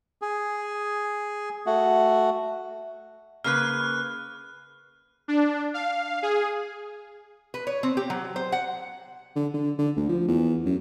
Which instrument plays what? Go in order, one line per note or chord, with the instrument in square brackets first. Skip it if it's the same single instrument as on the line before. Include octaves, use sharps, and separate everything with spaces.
[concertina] G#4
A3 F#4
[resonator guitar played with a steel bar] C#3 A#3 B4 [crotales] F6 F#6
[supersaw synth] D4
F5
G#4
[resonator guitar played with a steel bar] B4
C#5
C4
G4
F#3
C5
F#5
[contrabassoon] D3
D3
D3
D2
F3
E2
F#2